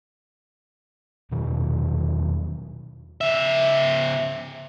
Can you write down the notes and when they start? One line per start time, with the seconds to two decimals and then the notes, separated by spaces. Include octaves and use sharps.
1.32 E2 B2 D#3 F#3
3.21 C#3 E5